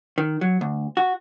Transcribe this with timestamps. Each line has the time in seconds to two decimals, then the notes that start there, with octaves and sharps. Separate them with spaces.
0.18 D#3
0.41 F#3
0.61 D2
0.97 F#4